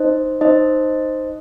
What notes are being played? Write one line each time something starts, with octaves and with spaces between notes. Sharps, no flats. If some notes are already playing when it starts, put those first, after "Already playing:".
Already playing: D#4 C5 D#5
D#4 C5 D#5